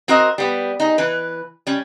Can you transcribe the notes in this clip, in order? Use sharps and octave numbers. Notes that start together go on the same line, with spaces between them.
C4 F#4 A#4 C5 D#5
G3 B3
D#4 G#4
E3 B4
G3 C#4